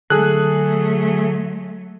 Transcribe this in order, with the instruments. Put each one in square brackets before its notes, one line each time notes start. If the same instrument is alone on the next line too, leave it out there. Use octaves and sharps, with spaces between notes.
[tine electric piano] D3 A4 [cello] F#3 A3 [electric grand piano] G#4 F#6